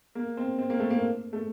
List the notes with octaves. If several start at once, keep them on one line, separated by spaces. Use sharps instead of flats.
A#3
C4
C4
A#3
A3
A#3
A3